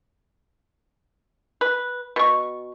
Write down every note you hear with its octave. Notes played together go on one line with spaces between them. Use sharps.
B4
B2 C#6